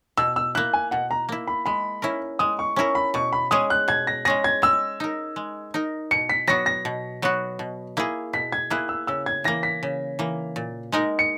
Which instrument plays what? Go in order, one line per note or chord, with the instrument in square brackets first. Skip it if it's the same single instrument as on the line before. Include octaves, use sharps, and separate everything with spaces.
[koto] B2 [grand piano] E6
[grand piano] E6
[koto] A#3 E4 [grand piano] F#6
[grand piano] G#5
[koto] B2 [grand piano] F#5
[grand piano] A#5
[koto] A#3 E4
[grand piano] B5
[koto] G#3 [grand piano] B5
[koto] C#4 E4 A#4
[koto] G#3 [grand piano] D#6
[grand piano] C#6
[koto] C#4 E4 A#4 [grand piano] C#6
[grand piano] B5
[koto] B2 [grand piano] C#6
[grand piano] B5
[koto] G#3 C#4 G#4 [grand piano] D#6
[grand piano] F#6
[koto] B2 [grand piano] G#6
[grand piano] A#6
[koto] G#3 C#4 G#4 [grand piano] A#6
[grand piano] G#6
[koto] G#3 [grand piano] E6
[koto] D#4 A#4
G#3
D#4 A#4
[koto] B2 [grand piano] C#7
[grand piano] B6
[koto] F#3 B3 F#4 [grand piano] A#6
[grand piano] A#6
[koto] B2
F#3 B3 F#4
B2
A#3 E4 G#4
[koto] B2 [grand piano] B6
[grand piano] G#6
[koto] A#3 E4 G#4 [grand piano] F#6
[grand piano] E6
[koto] C#3 [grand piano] E6
[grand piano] G#6
[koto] E3 A#3 [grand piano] A#6
[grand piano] B6
[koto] C#3
E3 A#3
A#2
G#3 D#4 A#4
[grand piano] C#7